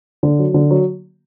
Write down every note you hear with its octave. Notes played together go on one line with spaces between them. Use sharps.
D3
F#3
D3
F#3